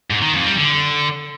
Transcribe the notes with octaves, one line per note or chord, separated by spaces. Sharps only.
G#2
D#3
F2
G3
D3